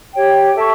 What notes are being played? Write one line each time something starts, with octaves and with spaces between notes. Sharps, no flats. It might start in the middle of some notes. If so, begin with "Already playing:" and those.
G4 C#5 G5
A4 E5 A5 C#6